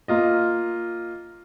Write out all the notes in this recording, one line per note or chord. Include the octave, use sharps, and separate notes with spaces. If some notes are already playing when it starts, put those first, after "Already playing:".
A#3 F4 D#5